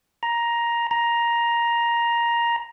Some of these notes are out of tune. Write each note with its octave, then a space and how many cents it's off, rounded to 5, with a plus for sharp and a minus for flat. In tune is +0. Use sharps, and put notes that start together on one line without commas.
A#5 +10
A#5 +10